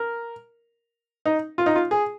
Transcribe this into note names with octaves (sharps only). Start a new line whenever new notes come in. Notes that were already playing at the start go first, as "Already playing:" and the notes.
Already playing: A#4
D#4
F4
D#4
F4
G#4